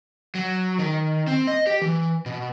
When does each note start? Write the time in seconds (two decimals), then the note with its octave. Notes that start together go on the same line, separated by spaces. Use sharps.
0.35 F#3
0.79 D#3
1.27 C4
1.47 D#5
1.67 G4
1.81 E3
2.26 B2